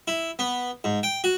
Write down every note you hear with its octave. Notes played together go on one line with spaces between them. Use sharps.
E4
B3
G#2
G5
F#4